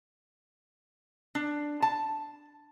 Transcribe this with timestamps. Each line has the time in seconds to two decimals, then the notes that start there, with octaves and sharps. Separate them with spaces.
1.35 D4
1.82 A5